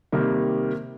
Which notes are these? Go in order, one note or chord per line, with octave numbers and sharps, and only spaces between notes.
C3 D#3 G3 A#3